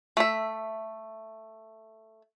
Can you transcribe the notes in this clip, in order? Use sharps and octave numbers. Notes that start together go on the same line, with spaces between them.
A3 E5